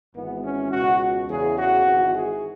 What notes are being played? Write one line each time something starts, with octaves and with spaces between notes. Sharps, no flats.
G#1 G#2 E3 B3
C#4
C#2 B2 F#4
E2 C#3 E3 G#4
F#4
G#1 G#2 E3
G#4